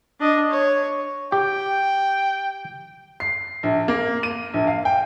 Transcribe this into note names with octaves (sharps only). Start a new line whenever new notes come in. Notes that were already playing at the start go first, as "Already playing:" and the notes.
D4 D#5
C#5
G4 G5
C7
A#1
A#3
D#7
A#1
F5
G5